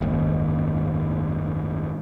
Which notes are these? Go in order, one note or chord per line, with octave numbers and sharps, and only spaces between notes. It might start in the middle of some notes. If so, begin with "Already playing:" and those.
F#1 D#2 G#2